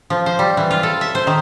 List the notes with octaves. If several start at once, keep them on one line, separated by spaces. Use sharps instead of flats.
F3
C5
G3
E3
F4
A4
E5
C5
D#3